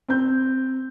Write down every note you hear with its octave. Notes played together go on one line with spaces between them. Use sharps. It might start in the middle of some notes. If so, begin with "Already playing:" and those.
C4 G6